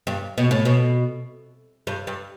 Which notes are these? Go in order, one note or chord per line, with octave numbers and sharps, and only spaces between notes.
G2
B2
A2
B2
G2
G2